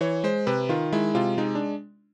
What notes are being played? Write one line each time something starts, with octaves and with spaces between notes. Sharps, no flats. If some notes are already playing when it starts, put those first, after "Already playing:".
E3 C#5
G#3 C5
C3 B4
D#3 F4
G#3 E4
C3 F4
G#3 D#4
D4